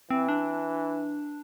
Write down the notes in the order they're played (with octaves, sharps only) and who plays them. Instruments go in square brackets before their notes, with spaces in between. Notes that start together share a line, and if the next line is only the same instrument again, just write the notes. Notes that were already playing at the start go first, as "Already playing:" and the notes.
[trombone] E3 [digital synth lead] C4
[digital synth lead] D4